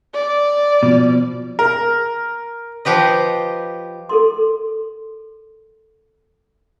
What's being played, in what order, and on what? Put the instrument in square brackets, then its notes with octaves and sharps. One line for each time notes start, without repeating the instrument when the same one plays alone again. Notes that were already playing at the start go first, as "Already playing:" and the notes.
[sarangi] D5
[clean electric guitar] B2 F3
[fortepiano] A#4
[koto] F3 G4 B4 D#5
[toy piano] A4 A#4 C6